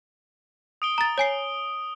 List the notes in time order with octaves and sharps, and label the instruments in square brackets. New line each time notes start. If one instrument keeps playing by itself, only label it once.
[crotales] D#6 D7 G7
[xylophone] A#5 A6
C#5 G#5 C7